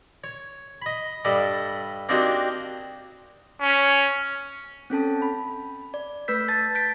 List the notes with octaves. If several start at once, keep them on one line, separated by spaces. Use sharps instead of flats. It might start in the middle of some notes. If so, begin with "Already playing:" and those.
C#5
D#5 B5
G2 A4 D5 D#5 B5 D6
A#3 C4 D4 D#4 F#4 G4
C#4
C4 C#4 A4 A5
B5
D5
A3 B4 E6 G6 B6
A5 A6
G6 A6 B6 D7